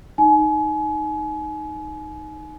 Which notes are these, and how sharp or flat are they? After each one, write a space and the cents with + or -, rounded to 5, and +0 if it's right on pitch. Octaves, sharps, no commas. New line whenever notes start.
D#4 +0 G#5 +30